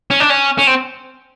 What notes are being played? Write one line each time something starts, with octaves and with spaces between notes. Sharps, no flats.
C#4
D4
C#4
C#4
C4